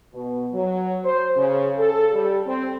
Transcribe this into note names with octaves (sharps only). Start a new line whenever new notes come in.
B2
F#3
C5
C#3
A4
G3
C4